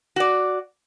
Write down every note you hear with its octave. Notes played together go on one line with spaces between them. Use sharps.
F#4 D5